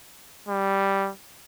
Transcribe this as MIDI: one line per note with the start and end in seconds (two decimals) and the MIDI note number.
0.49 1.10 55